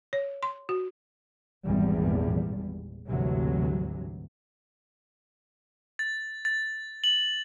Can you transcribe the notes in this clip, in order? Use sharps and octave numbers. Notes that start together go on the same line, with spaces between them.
C#5
C6
F#4
G#1 E2 A#2 G3
G#1 D2 G2 C3 E3 F#3
A6
A6
F#7